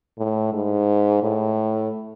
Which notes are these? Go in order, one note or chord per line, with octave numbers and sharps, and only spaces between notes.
A2
G#2
A2